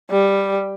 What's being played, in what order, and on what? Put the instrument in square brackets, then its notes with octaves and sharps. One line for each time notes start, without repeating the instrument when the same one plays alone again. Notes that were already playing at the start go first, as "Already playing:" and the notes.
[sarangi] G3